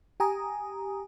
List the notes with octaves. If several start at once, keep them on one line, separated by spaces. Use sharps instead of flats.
G4 G#5 A#5 D#6